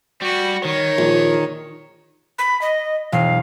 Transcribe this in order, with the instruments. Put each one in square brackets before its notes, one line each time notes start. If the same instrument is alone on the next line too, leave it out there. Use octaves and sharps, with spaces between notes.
[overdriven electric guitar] G3 [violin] F#4
[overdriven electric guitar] D#3 [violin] C#5
[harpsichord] A#1
[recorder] B5
D#5
[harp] E1 [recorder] F5